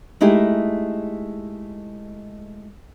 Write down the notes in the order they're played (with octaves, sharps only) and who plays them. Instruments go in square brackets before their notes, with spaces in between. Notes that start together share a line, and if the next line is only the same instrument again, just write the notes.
[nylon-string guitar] G#3 A3 D#4 E4 G4 G#4